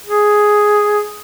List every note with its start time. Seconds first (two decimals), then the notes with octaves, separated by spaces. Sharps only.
0.06 G#4